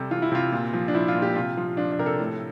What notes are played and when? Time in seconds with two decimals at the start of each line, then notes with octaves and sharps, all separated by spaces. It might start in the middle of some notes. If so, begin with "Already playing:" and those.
Already playing: C3 G3 A4
0.11 E3 F4
0.22 E4
0.32 C3 F4
0.52 A#2
0.74 F3
0.88 D4
0.94 F3 E4
1.08 F4
1.15 A#2
1.22 G4
1.36 C3 F4
1.57 F3
1.77 F3 D4
1.92 D4
1.99 C3 A#4
2.06 A4
2.19 A2